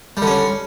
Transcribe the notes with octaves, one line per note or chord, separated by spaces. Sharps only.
D3 G3 C#4